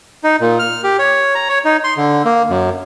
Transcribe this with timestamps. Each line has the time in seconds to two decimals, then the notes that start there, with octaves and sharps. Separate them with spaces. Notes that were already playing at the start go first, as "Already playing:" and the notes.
0.24 D#4
0.41 A#2
0.59 F6
0.84 G4
0.99 C#5
1.35 A#5
1.49 C#5
1.65 D#4
1.84 C6
1.97 D3
2.25 A#3
2.50 F#2